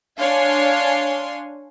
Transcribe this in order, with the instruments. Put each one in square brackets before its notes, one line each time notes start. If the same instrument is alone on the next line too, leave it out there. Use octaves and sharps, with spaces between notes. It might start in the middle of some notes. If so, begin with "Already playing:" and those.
[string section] D4 C#5 F5 G#5 C6